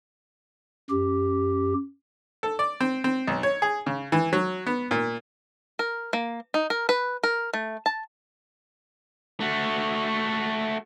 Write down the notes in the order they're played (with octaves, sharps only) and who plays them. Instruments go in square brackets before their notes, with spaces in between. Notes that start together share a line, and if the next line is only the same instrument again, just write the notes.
[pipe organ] F#2 G4
[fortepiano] A4
D5
C4
C4
B1
C#5
G#4
C#3
E3
F#3
B3
A#2
[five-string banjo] A#4
A#3
D#4
A#4
B4
A#4
A3
A5
[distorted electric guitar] A3 F#4